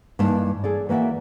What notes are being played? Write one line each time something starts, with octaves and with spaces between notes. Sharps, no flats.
G2 E3 A#3 D#4 A5
G#4 A4 D5
E3 A#3 F#4 D5 E5